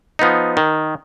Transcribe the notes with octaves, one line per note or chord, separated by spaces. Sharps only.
F3 B3 D#4
D#3